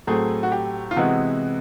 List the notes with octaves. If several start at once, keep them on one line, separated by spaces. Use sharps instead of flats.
A2 F#3 A3 C4 G#4
F#4
G4
F4
C3 E3 G#3 B3 F#4